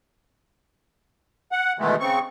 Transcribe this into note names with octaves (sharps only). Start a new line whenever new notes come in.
F#5
B2 D#3 E3 G#3 A3
C#3 C4 C#6